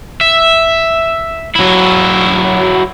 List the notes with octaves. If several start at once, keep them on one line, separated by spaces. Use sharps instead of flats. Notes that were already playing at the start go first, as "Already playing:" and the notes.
E5
F#3 E4